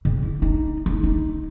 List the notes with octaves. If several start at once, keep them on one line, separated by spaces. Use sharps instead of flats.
C#3
E4
D#4
D#4
D#4